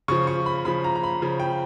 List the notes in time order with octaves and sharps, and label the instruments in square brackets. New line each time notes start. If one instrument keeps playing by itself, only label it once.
[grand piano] C#3 F3 C#6
C#6
B5
C#3 F3 B5
A#5
A#5
B5
C#3 F3
G5